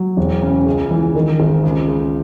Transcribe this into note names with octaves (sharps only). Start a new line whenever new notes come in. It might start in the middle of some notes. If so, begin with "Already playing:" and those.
Already playing: F#3
E1
C#3
C#2
E3
D#3
G#1
C#2
C#2